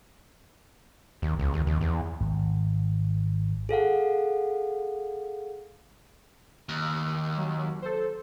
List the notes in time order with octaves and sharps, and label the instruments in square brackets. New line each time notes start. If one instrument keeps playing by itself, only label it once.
[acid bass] D#2
C#2
D#2
D#2
E2
[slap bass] G#1
[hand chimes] G#4 A4 F5 F#5
[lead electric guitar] D#2
[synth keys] F#3
A4 C5